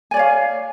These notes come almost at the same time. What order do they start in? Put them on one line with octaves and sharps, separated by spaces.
G#5 D5 C#5 F5